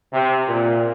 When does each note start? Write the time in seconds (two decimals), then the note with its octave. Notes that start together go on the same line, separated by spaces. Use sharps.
0.13 C3
0.48 A#2